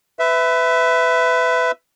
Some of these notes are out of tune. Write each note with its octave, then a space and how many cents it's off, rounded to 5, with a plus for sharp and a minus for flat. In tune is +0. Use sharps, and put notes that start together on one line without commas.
B4 +25 E5 +0